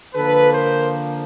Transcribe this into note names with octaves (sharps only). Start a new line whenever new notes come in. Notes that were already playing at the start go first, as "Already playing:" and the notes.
D3 F3 A#3 A4 B4
A#4 C5